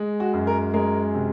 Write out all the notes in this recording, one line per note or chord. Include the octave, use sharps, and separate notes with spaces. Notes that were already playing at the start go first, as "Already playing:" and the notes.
Already playing: G#3
F#4
F#2
A#4
G#3 A#4
C3